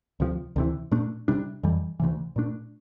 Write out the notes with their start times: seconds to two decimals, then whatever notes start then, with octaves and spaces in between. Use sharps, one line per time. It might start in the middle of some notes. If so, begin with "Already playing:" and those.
0.20 D2 C3 F3
0.56 D2 C3 E3
0.92 A#2 A3 D4
1.28 C3 G3 D4
1.63 F2 E3 G3
2.00 D2 C3 E3
2.36 A#2 A3 D4